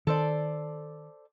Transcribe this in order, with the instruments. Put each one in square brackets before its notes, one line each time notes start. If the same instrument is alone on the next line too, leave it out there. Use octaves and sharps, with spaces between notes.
[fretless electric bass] D#3 [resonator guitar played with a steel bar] A4 C5 D5